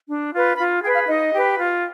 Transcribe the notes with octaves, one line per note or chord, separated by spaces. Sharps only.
D4
F4 B4
F4 B5
G#4 B4 G5
F5
D#4 D#5
G4 B4
F4